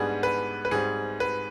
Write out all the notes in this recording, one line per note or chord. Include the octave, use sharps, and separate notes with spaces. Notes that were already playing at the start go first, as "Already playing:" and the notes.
Already playing: G#2 G3 B3 D4 G#4
B4
B4
G#2 G3 C4 G#4
B4